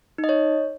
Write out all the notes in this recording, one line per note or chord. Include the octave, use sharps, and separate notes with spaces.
D#4
D#5
C#5